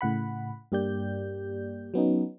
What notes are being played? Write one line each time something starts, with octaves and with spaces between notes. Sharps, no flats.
A2 C#3 F#5 B5
G2 A#3 G4 D5 G6
F#3 B3 C#4 D#4